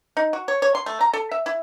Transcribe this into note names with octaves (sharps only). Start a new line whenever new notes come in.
D#4
F#4
C#5
C#5
C6
A3
A#5
A4
E5
E4